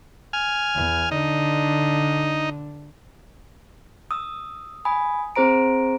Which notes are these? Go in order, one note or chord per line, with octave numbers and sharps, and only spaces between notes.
G#5 F6
E2
D3 D4 D#4
D#6 E6
G#5 B5 D#6
C4 G#4 C5 A#5 D7